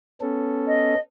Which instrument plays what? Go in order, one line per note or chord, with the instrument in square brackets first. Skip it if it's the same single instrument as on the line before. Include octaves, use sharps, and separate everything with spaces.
[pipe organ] B3 C#4 A4
[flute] D#5